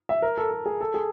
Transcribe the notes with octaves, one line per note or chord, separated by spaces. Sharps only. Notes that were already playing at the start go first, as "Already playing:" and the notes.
E5
A#4
A4
A4
G#4
A4
G#4